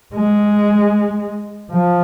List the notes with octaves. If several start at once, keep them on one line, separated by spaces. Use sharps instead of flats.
G#3
F3